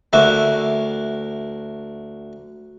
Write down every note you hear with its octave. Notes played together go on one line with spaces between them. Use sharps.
D2 A#3 F#4 E5